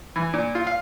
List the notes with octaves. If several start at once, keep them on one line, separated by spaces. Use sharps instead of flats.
E3
A#2
F4
F5